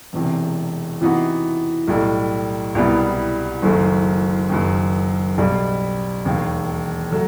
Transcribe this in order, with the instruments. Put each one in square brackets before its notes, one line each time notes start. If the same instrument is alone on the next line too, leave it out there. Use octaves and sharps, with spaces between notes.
[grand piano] E1 E2 C3
C3 E3 B3 D#4 F#4
B1 A2 G3
C2 B2 G3 B3 E4
F#1 F#2 D#3 A3
F#1 F#2 D#3
B1 B2 G3
E1 D#2 D#3
F#3 A3